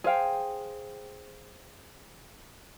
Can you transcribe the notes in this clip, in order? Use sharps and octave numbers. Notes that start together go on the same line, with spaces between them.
G#4 C5 F5 G5